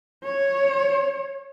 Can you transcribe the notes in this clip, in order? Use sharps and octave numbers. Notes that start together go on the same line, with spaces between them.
C#5